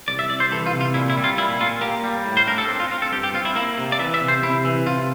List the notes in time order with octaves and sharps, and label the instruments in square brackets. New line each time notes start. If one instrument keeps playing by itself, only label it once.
[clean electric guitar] C2 D5
E5
C2 D5
C5
E3 A4
F4
C3
F4
A#2 E4
E4
G3
F4
A#2 E4
A#2 F4
A#3 G4
G3
A2
C5
D4 A#4
A4
C4
F4
C4 F4
A4
G2 G4
G4
C4 F4
E4
A#3 E4
C3
D5
E3 E5
E5
C3
C5
C3 E4
E3
C3 F4